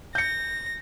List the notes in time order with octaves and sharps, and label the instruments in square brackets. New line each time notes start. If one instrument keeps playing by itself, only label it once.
[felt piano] G6 C#7 [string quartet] A#6